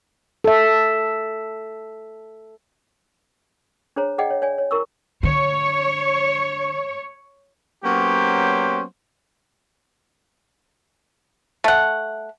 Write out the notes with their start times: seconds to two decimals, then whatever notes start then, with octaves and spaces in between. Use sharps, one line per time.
0.44 A4 E5
3.96 D4 G#4 C5 C#5 A#5
4.18 G#4 D5 D#5 F#5 G5
4.30 C#5
4.42 C#5 D5 G#5
4.58 C#5
4.71 E4 A#4 C#6 E6
5.23 D3 C#5
7.84 F#3 A#3 B3 C#4 G4 C5
11.64 A3 F#5